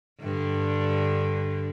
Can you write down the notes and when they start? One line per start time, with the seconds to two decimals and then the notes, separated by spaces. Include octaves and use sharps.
0.22 G2 D3